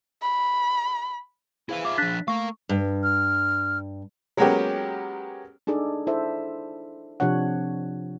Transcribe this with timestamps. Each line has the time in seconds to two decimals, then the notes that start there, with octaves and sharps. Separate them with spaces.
0.22 B5
1.69 E4 G#4 B4 C5 F5
1.85 F4 E5 D6
1.98 F3 D4 F#6 A6 B6
2.28 A3 A#4 F5 C#6
2.69 G2
3.03 F6
4.37 F#3 G#3 A#3 B3 C#4 G4
5.67 D4 D#4 G#4 A4 D5
6.07 E4 A4 C5 E5
7.20 C3 F3 D4 C#5 F#5